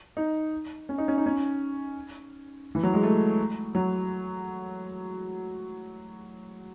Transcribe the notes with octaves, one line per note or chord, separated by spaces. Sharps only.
D#4
C#4
D#4
C#4
D#4
C#4
E3
F#3
G#3
A3
F#3